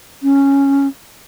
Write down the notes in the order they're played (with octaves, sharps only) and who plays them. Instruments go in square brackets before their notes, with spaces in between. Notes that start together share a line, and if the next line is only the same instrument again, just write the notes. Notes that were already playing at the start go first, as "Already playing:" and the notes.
[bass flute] C#4